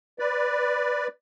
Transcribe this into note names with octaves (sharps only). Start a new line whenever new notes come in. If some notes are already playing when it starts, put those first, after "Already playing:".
B4 D5